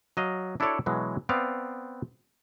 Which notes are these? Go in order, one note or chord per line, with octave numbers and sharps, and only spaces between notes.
F#3 D#5 F5
D4 E4 F#4 A4 C#5 D5
B2 E3 F#3 G#3
B3 C4 D5 F5